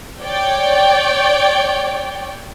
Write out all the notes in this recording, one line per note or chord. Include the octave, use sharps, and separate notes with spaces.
C#5 D5 G5